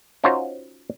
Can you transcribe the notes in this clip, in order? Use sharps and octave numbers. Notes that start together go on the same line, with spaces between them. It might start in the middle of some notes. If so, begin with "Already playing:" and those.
C#4 D#4 F4 F#4 C5 C#5